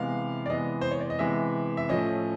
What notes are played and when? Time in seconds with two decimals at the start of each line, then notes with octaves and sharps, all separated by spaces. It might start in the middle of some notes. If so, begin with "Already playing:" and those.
Already playing: C3 E3 G#3 B3 F5
0.46 D5
0.50 C3 E3 G#3 B3 D#5
0.81 C5
0.91 C#5
1.00 D5
1.10 D#5
1.19 C3 E3 G#3 B3 E5
1.77 E5
1.89 A2 F3 A3 C#4 D#5